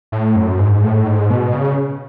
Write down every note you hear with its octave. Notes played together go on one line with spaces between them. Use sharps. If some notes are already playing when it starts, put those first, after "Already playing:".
A2
F#2
G#2
A2
G#2
B2
C#3